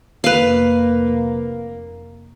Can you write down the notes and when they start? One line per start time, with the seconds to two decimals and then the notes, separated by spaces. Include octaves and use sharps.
0.24 F1 A#3 B4 F5